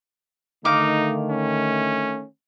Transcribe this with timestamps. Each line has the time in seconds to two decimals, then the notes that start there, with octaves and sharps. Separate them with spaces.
0.65 D3 D#3 A3 D#4 F5 D6
1.30 C#4